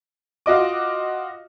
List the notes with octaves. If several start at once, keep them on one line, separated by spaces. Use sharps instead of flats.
F4 F#4 D#5 D6